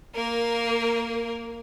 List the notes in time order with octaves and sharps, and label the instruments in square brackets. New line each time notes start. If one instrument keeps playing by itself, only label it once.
[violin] A#3 A#4